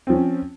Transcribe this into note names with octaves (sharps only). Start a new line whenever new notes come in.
F3 C4 C#4